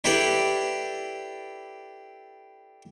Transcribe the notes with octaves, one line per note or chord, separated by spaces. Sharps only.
D4 E4 G4 A4 B4 D5